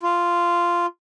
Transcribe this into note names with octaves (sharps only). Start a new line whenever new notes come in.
F4